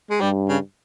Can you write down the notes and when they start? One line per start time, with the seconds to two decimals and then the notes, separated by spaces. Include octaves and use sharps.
0.10 G#3
0.21 G2 G3
0.49 C#3